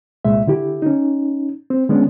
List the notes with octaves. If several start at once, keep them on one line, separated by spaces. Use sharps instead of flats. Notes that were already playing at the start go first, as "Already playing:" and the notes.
C2 A#2 G#3 E5
D3 E4 G4
C#4 D#4
C4
D3 G#3 B3 C#4 D4